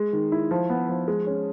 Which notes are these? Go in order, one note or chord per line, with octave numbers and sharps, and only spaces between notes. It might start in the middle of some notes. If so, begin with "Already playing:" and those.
Already playing: G#3
D#3
E4
F3
B3
F3
G#3
C#4